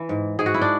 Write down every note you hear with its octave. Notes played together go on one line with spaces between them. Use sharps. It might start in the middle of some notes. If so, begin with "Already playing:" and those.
Already playing: E3
G#2
G#2 G#4
F#4
E4
D4